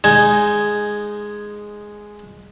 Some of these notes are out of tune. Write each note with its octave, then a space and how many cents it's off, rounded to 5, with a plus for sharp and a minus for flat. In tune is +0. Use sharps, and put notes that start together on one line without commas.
G#3 +0 D#4 -10 G#5 +0